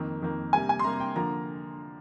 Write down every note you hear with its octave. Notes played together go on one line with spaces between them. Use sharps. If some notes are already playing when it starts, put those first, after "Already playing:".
Already playing: F2 D#3 A#3
F2 D#3 A#3
C3 G3 A#3 G#5
G#5
C6
C3 G3 A#3 A#5
G5
D3 F3 A#3 A#5